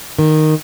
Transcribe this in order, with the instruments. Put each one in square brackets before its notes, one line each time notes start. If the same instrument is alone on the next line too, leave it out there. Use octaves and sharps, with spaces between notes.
[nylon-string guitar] D#3